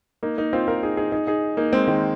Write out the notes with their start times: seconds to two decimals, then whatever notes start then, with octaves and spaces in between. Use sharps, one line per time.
0.23 A#3 D#4
0.38 A#3 D#4
0.53 C4 F4
0.68 F4 A#4
0.83 D#4 G#4
0.97 D#4 G#4
1.12 D#4 G#4
1.27 D#4 G#4
1.57 A#3 D#4
1.72 G#3 C4
1.87 D#3 G#3